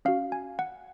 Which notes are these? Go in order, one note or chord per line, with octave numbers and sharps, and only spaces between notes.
C#4 F#4 F5
G#5
F#5